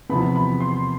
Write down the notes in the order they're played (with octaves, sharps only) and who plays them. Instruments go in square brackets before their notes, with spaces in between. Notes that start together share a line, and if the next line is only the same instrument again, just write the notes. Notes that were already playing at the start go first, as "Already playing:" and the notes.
[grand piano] E2 C3 F3 B3 B5
B5
C6